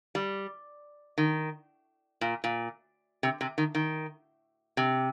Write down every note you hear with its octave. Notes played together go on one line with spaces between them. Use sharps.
G3
D#3
A#2
A#2
C3
C3
D#3
D#3
C3